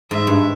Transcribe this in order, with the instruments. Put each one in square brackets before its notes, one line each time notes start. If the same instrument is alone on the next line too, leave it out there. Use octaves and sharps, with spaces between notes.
[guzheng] G#2 [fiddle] E5
[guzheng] G2